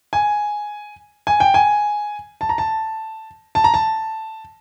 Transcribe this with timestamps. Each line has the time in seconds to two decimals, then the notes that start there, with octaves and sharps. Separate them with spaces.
0.13 G#5
1.27 G#5
1.40 G5
1.54 G#5
2.41 A5
2.49 A#5
2.58 A5
3.55 A5
3.64 A#5
3.74 A5